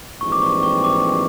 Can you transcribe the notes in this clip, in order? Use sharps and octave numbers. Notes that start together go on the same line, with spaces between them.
A#1 G#2 E3 G3 C4 C#6
D6
C#6
C#6
D6